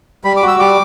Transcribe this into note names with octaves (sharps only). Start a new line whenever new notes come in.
G3 B5
D6
F#4
E6
G3 D6